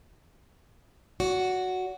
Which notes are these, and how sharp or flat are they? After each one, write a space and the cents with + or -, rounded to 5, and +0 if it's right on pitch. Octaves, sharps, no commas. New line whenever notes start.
F#4 +0 D5 -45